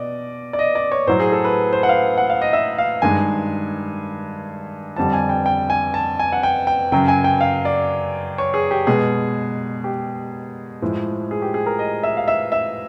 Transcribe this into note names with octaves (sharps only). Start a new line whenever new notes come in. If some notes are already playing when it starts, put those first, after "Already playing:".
Already playing: B2 D5 D#5
D5
D#5
D5
C#5
A2 F#3 C5
G#4
A4
B4
C5
F#5
F5
F#5
F5
D#5
E5
F5
G2 D#3 G#3 G#5
F2 D3 G3 A5
G#5
G5
G5
G#5
A5
G#5
F#5
G5
G5
F#2 C#3 F#3 G5
G#5
G5
F5
D5
C#5
G#4
G4
B2 G#3 G#4
G4
A2 F3 G#3
G#4
G4
G#4
A#4
D#5
E5
F5
E5
E5